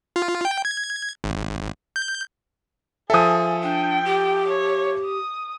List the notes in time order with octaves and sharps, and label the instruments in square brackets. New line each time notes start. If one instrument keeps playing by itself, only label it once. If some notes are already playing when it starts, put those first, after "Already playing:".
[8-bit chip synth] F4
G5
G#6
G#1
G6
[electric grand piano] F3 A4 [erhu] G#4 [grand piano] E5 G#5 D#6
[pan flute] D4 [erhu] G5
[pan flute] G4
[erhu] C#5
D#6